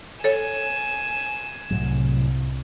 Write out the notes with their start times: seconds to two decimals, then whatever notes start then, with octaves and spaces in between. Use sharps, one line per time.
0.24 A4 C#5 G#5 E7
1.70 C2 A2 F#3